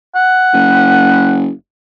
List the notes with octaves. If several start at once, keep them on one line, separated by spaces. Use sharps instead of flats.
F#5
F#1